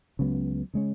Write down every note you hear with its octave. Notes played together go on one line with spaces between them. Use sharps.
C#2 C#3 F#3 B3
C#3 G#3 C#4